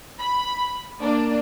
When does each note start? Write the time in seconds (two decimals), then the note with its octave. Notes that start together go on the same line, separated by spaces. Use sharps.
0.18 B5
1.01 A#3 D4